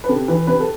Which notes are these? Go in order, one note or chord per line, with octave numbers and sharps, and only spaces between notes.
B4
C3 A4
E3 B4
C3 B4
A4